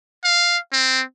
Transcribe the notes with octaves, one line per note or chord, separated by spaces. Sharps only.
F5
C4